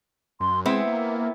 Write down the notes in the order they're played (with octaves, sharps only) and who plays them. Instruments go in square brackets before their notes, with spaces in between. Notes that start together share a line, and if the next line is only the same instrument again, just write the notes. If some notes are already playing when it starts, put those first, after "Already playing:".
[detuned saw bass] F#2 [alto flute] C6
[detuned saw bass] G#3 [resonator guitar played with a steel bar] B3 C4 E4 [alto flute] E5
[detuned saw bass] A#3
[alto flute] E5